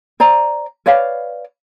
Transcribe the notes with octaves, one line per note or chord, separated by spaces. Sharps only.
C5 D5 A#5
B4 C#5 D5 F5